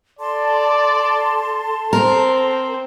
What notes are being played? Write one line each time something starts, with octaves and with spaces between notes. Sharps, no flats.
A4 D5 A5 C6
C4 A#4 C5 A#5